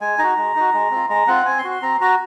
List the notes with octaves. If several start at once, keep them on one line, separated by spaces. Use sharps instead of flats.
G#3 G#5
D#4 F#4 A#5
G#3
D#4 F#4
G#3
C4 F4
G#3 A#5
C4 F4 F#5
C4 G#5
C6
F#4
C6
C4 A#5
F#4 A#5